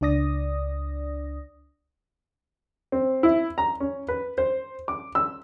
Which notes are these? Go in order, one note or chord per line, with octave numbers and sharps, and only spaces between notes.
C#2 D4 D5 D#6 A#6
C4
E4
A#5
C#4
B4
C5
D6
E6